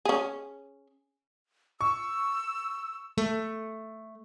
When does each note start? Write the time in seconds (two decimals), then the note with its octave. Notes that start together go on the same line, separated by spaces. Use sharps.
0.05 C#4 G#4
1.81 C#6 E6
3.18 A3